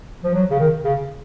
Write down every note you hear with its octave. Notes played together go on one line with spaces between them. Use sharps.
F3
F#3
C#3
D#3
C#3